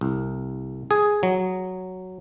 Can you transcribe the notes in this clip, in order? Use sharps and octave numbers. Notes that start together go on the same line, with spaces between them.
C2
G#4
F#3